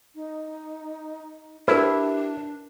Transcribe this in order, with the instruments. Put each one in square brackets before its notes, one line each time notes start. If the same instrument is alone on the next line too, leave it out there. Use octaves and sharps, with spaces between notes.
[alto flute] D#4
[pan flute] D4 [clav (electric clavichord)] E4 [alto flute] G4 [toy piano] A#4 B4